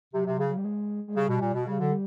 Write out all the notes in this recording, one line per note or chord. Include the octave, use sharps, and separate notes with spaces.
C3 F#3
C3
C#3
F#3
G3
G#3
G#3
C#3 G3
B2
A#2
B2
C#3 G3
D3 F#3
G3